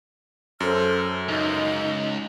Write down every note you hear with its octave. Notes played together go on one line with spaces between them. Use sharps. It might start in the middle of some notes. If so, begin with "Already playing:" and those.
F#2 A4 C5 F6
C#2 D#4